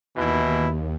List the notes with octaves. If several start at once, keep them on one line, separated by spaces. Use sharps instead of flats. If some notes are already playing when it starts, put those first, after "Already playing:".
D#2 B2 E3 E4